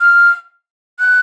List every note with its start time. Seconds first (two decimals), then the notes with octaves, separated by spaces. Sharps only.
0.01 F6
0.99 F#6